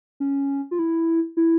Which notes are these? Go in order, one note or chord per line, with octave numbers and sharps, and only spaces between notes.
C#4
F4
E4
E4